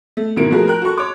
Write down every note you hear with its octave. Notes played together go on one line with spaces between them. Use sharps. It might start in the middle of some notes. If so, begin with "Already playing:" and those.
A3
G#1 B2 D#3 A#3 E4 D7
F3 A3 F#4 G#4 A#4
A#4 G5 F#6
F#4 A4 C#6
C#5 D6